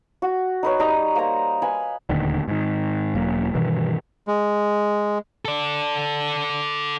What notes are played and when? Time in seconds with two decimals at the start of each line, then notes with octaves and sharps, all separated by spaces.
0.22 F#4
0.63 D#4 B4 C#5
0.79 G3 D#4 A#5
1.15 A#3 C5 A#5
1.62 B4 F5 G#5 B5
2.09 D#1 D2 D3 D#3
2.48 G#2 D#3
3.15 E1 F#3 A#3
3.55 G2 B2 D#3 E3
4.28 G#3
5.45 A4 D5